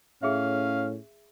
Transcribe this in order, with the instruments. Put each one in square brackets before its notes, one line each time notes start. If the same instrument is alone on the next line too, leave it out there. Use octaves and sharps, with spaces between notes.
[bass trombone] A2 [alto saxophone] C#4 [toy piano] G#4 E5 [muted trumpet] F5